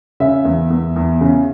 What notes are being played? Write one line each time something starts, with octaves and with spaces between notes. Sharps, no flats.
C#3 E5
E2
E2
E2
C#3